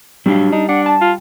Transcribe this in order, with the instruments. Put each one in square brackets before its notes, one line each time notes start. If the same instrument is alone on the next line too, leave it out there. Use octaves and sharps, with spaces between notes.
[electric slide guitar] F#3 D4 F5 [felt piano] G3
[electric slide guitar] D4 [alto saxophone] D#4
[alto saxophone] D4 [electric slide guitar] F#5
[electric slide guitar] A5
[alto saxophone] F4